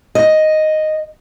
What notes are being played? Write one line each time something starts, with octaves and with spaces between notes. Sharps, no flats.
D#5